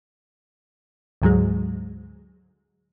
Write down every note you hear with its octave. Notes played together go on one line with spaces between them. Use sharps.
D2 G#2 F#3 G#3